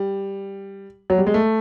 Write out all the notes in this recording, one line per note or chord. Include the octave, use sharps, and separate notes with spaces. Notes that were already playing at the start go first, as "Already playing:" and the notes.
Already playing: G3
F#3
G3
G#3
A3